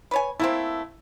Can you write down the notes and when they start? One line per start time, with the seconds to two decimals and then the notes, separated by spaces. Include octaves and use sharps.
0.11 B4 C#5 G#5
0.40 A3 A#3 C4 E4